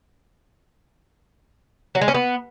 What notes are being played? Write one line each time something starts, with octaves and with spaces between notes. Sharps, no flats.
F#3
G#3
C#4
B3